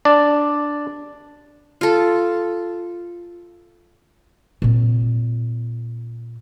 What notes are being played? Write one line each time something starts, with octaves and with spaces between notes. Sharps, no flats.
D4 D5
F4 A4
A#2 C4